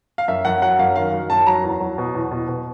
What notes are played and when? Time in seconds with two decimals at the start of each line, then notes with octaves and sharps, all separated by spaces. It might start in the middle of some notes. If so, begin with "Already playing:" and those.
0.18 F5
0.28 F#2 E5
0.45 F#2 F#5
0.62 F#3 F#5
0.79 F#2 F5
0.96 D#3 F5
1.13 F#3
1.30 F#2 A5
1.47 F#3 A#5
1.63 E2
1.80 F#3
1.98 B2
2.15 E2
2.31 B2
2.48 B2